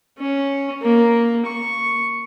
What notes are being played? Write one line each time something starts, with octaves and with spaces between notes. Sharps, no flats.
C#4
A#3
C#6